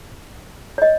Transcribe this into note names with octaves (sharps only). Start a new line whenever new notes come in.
C#5
D#5